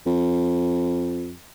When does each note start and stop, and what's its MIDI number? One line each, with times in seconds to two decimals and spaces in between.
0.06 1.34 41